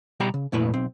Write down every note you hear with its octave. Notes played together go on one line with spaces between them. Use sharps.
B2 G3 G4 G5 A#5 B5
C#3
F2 A#2 A3 E4 B4
B1 C4